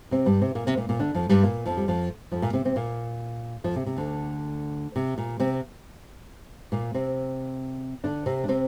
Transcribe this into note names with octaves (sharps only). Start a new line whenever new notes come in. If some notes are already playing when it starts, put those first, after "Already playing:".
C3 C4
G2 G3
C3 C4
A#2 A#3
C3 C4
A#2 A#3
A#2 A#3
D3 D4
F2 F3
G2 G3
A#2 A#3
F2 F3
G3
F2 F3
F2 F3
A#2 A#3
C3 C4
C3 C4
A#2 A#3
F2 F3
C3
C3
D2 D3
C3
A#2
C3 C4
A#2 A#3
C3 C4
D3 D4
C3 C4
D4
C3 C4